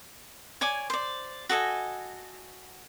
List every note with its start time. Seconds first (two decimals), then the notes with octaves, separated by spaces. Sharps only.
0.61 C#5 D5 G#5 D6
0.90 C5 D5
1.49 F#4 A4 D#5 G#5